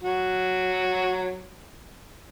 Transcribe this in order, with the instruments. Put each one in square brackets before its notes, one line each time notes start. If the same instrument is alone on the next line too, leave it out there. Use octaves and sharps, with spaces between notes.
[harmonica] F#3 F#4